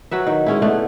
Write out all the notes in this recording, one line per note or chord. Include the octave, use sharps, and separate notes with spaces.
F#3 B4 E5
D#3
G#3 C#4 E4
D3 A3 B3